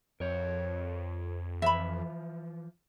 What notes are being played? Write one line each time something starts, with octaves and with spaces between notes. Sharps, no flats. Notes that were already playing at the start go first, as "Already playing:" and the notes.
F2 A#4 C#5
E3 F3 E5 B5